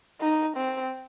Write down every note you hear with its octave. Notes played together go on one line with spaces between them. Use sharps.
D#4
C4